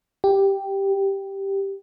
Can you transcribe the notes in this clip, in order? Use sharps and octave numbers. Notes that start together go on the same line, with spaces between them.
G4